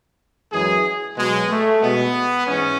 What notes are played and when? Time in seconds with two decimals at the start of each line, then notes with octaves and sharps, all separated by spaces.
0.52 F#2 E3 G#3 G#4
1.17 B2 F#3 G#3
1.50 A3
1.81 B2 G#3 B3
2.47 G#2 E3 G#3 C#4